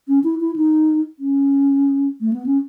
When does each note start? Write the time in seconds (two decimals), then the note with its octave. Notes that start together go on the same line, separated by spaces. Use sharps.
0.08 C#4
0.24 E4
0.40 E4
0.56 D#4
1.19 C#4
2.21 A3
2.33 B3
2.46 C#4